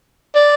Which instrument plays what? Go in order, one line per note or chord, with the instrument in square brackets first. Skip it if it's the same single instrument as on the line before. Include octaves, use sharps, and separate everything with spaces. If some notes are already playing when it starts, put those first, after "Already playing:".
[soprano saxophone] D5